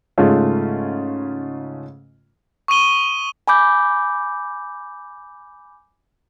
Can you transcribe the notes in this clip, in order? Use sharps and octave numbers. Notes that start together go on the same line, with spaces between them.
G#2 C#3 G#3 A3 C#4 F4
C#6 D#6 D#7 G7
G#5 B5 D6 G6